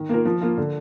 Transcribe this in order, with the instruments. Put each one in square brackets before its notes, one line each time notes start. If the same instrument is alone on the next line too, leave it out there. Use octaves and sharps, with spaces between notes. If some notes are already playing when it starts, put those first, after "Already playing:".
Already playing: [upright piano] D#3
A#3 F4 A#4
F3
A#3 F4
D3